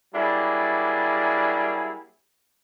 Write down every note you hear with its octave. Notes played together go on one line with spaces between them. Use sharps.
F#3 G3 A#3 D4 E4 G#4